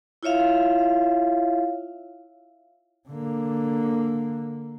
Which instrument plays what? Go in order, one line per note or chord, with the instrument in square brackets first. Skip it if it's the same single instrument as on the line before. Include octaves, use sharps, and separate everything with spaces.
[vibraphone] E4 F4 C#5 E5 F5
[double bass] D3 A#3